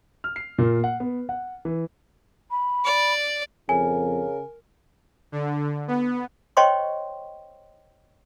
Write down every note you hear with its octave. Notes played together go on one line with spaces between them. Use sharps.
F6
C7
A#2
F#5
B3
F#5
E3
B5
D5
F2 C#3 A#4 G#5
D3
B3
C5 C#5 D#5 G5 C6 C#6